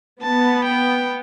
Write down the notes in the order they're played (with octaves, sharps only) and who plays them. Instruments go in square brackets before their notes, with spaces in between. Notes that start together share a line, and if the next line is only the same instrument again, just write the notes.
[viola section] B3 [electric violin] A5
[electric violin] G5